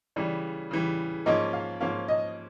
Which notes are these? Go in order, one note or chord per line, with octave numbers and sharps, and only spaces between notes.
C#3 E3 G3 D5
C#3 E3 G3
G#2 F3 A#3 C#4 D#5
F5
G#2 F3 A#3 C#4 F5
D#5